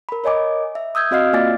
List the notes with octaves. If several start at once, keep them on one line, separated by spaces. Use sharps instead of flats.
A#4 B5
A#4 C#5 D#5 G#5 D6
E5
D#6 E6 G6 G#6
C4 F#4 D#5 F5 F6 C7
A#3 F4 D5 G#5 D6 A6